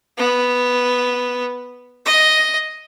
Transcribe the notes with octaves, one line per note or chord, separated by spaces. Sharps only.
B3
D#5